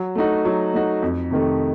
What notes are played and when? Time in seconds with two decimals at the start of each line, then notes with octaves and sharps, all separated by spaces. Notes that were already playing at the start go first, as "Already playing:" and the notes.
Already playing: F#3
0.15 A3 D#4 F#4
0.45 F#3
0.73 A3 D#4 F#4
1.02 F2
1.31 C3 D#3 A3